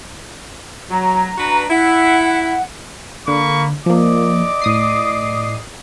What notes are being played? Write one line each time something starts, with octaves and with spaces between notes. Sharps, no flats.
F#3 A#5
D4 F#4 B4
E4 F#5
D3 A#3 B5 C#6
F3 A#3 D5 D#5 D6
A2 D#6 C7